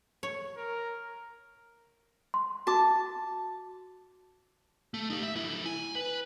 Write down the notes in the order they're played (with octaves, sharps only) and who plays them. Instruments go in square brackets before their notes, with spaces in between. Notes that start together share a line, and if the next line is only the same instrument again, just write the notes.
[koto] C#5
[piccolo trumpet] A#4
[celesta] C6
[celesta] F#4 D6 [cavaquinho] A5
[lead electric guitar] A3
D#4 G4
E5
D3 E4
G#5
B4